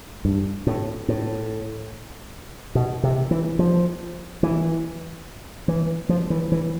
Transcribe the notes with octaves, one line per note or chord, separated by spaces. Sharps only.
G2
A2
A2
B2
C3
E3
F3
E3
E3
F3
E3
E3